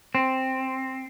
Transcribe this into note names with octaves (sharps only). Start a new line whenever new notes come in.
C4